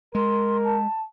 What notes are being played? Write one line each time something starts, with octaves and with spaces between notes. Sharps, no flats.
G#3 A#4 C6
A5